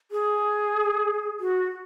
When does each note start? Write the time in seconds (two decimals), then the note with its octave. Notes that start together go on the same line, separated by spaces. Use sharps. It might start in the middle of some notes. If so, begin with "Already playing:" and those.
0.11 G#4
1.40 F#4